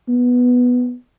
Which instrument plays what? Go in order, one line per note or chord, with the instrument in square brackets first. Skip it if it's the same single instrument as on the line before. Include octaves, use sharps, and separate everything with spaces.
[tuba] B3